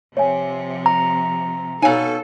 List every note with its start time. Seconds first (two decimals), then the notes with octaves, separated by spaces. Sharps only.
0.17 C3 F3 C#5 E5 G#5
0.86 A#5
1.82 B2 D#4 A4 C#5 F5 G#5